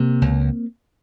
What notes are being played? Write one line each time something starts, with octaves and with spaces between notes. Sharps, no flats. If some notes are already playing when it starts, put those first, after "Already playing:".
Already playing: C3 A#3 C4
C#2